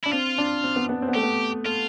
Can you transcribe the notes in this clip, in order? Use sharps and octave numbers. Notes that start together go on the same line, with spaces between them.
D4 E4
C4 F4
D4
C4
B3
B3
C4
B3
A3 G4
B3
A3 F4